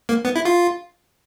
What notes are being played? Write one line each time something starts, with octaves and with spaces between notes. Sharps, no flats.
A#3
B3
E4
F4